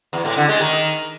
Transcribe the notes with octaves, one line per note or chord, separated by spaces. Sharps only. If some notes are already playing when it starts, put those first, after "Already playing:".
E2
A2
D3
G#3
D#3